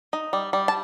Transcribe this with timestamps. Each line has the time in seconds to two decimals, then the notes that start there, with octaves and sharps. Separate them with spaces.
0.13 D#4
0.33 G3
0.53 G3
0.68 A5